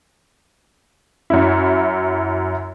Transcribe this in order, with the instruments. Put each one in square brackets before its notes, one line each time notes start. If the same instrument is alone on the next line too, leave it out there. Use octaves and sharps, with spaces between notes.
[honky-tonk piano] F#2 E4